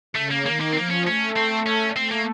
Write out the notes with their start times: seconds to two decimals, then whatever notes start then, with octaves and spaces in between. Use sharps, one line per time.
0.15 C#3 A3
0.31 A#3
0.46 D#3 A#3
0.61 A#3
0.72 C4
0.76 F3 A#3
0.91 C#4
1.06 A3 C#4
1.36 C4
1.66 C#4
1.96 A3 C4
2.11 A#3